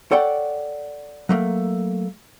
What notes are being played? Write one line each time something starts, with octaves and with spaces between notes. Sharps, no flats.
A4 C#5 D5 F#5 G5
F#3 A3 A#3